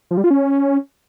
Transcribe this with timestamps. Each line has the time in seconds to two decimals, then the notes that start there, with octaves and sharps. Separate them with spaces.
0.11 F3
0.17 G3
0.24 F4
0.30 C#4